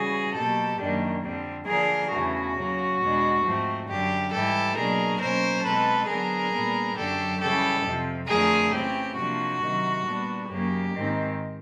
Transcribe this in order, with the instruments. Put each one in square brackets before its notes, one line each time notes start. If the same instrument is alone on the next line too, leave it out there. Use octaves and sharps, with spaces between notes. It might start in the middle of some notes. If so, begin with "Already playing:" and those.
Already playing: [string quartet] C#3 E3 G3 F#4 G#4
B2 F#3 A#3 G4 A4
F#2 D#3 G3 A#3 D4
F2 D3 G3 C4
D3 F3 A#3 D4 G#4 A#4
E2 C#3 E3 A3 F#4
C#3 F#3 A#3 C#4
E2 B2 G#3 B3 D4
G#2 F3 A3 C4
F#2 D3 G3 G4
G#2 E3 G3 G4 A4
B2 F#3 A#3 D4 G#4 A#4
B2 F#3 A#3 C#4 A#4 C5
B2 G#3 C4 A4 B4
D3 F#3 B3 D4 G#4 A#4
A#2 G3 B3 D4
F#2 D3 F#3 G4 A4
C#3 E3 G3 G4 A4
F2 C3 F3
F2 D3 F3 A3 G#4 A#4
C#3 E3 A3 C4 G4
C3 F3 A#3 D4 F#4
C3 D#3 F#3
A#2 G3 B3 D4
F#2 C#3 F#3 A#3 G4
G#2 D#3 G#3 C4